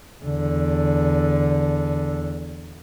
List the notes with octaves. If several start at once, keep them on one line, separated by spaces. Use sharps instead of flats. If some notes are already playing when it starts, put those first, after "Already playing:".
E2 D3